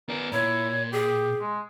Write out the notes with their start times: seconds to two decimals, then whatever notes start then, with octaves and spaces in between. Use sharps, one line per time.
0.09 B3 A#4 D5
0.33 A#2 E4 C#5
0.92 G4 G#4
1.41 G#3